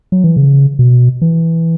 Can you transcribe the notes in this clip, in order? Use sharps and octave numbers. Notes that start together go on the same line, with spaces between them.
F#3
E3
C#3
B2
E3